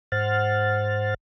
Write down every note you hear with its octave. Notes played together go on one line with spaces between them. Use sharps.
G#2 C5 F#5 F6 A6